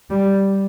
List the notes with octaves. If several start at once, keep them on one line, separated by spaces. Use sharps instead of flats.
G3